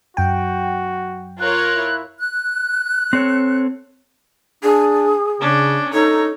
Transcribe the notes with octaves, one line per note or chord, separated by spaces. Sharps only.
F#2 F#4 G5
F4 A#4 C#5 F#6
E4
F#6
C4 A4 C#5
D4 G#4
C#3 C#4 D4
D#4 A4 C#5